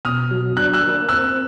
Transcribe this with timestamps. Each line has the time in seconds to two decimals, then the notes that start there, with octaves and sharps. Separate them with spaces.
0.05 B2 D#6 F6
0.31 F#3
0.56 D4 F#6
0.73 E6 F#6
0.83 A#3
1.09 C4 E6 F#6